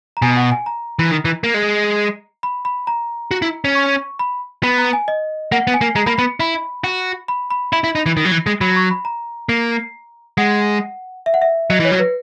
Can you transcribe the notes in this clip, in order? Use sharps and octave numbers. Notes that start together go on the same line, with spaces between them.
A#5
B2 G#5
F#5
G#5
A#5
E3
D#3
E3
A#3
G#3
B5
B5
A#5
F#4
E4
C#4
C#6
B5
B3 B5
A#5
G#5
D#5
A#3 F#5
B3
G#5
A#3
G#3 A#5
A#3 B5
B3 B5
E4 B5
F#4
B5
B5
E4 B5
E4
D#4
E3
D#3
F#3
E3
G#3
F#3 B5
C#6
B5
A#5
A#3
G#3 F#5
E5
F#5
E5
F#3 D#5
E3 C#5
F#3
B4